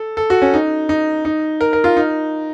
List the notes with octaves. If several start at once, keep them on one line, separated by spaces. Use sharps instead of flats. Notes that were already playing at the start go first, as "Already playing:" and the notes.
Already playing: A4
A4
F#4
C#4
D#4
D#4
D#4
A#4
A#4
F4
D#4